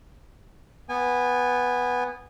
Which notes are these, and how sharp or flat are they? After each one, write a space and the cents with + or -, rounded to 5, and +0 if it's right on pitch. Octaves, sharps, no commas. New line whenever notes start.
B3 +0 G#5 -25